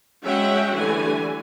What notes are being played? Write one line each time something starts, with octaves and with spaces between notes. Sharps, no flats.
F#3 G#3 C#4 E5 F#5 G5
D3 E3 G3 A3 G#5